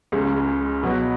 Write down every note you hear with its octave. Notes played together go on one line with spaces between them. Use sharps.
C#2 C#3 G#3
B2 F#3 B3 F#4 B4